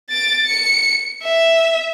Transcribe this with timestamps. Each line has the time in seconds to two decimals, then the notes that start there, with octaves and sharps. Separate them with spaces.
0.10 A6 D7
0.46 C#7
1.23 E5